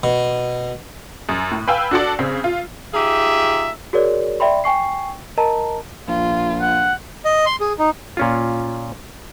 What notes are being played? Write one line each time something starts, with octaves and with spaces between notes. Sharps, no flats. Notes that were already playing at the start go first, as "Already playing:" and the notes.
B2
F#2
A2
B4 F5 G5 G#5 E6
D4 F#4 A4 D5
C#3 C4
F4
D#4 F4 G4 G#4 E5
F#4 G#4 A#4 C#5 D5
D5 E5 G5 B5 C6
G5 G#5 C#6 C7
A#4 D#5 A5 A#5
A#1 F4
F#5
D#5
C6
G#4
D#4
A#2 C#4 F4